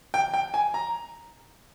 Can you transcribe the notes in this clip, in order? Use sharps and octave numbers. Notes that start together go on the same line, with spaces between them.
G5
G5
G#5
A#5